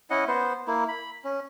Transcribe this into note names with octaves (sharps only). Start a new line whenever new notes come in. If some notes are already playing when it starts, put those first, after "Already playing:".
C#4 E4 D#5 F#5
B3 C5
A#3 E4
B5
C#4